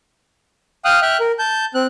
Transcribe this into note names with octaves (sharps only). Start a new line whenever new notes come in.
F5 G5 D#6 F6 F#6
E5 G5 F6 F#6
A#4
A5 G6
C4 F#6